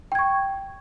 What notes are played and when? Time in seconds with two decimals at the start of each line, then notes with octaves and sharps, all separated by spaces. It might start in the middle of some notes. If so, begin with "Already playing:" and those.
0.12 G5
0.15 G#6
0.19 C#6